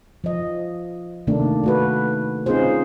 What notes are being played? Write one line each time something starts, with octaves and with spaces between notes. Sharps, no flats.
F3 D#5
C3 D#3 A3 A#3 D4
A3 F#4 B4
C4 C#4 D#4 F4 G#4 C5